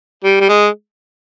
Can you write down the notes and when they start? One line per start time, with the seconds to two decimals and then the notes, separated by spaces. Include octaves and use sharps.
0.24 G3
0.41 G3
0.49 G#3